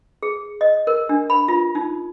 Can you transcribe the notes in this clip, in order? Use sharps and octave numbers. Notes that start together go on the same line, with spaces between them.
G#4
D#5
A#4
D4
B5
F4
D#4